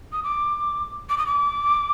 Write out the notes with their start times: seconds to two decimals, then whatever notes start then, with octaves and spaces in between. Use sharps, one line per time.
0.12 D#6
0.24 D6
1.09 D6
1.18 D#6
1.26 D6